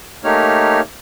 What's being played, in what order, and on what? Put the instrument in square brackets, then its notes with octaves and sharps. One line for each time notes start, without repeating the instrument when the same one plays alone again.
[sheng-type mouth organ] A3 A#3 D#4 G4 C#5 F6